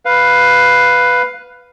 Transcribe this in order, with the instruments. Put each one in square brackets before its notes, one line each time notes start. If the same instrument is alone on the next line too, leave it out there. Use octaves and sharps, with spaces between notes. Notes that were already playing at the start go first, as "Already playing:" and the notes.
[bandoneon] B4 F5